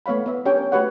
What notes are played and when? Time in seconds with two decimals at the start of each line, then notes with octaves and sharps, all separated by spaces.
0.06 A3 B3 C#5 F5 B5
0.26 B3 E5
0.45 C#4 D4 G4 C#5 G5
0.57 A#4
0.72 A3 F#4 G4 B4 C#5 F#5